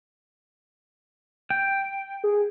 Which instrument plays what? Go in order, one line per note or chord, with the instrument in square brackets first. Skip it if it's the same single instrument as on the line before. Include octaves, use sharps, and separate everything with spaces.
[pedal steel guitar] G5
[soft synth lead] G#4